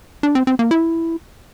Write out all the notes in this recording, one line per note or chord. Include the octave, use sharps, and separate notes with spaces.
D4
C4
C4
A#3
E4